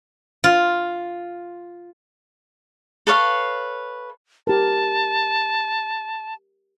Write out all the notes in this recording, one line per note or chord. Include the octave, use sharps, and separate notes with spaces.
F4
A4 B4 C#5 F5
G4 A#4 A5